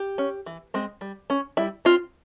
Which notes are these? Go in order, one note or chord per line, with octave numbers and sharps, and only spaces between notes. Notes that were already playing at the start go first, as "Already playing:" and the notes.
Already playing: G4
C#4
E3
G#3 C4
G3
C#4
G3 E4
C4 F4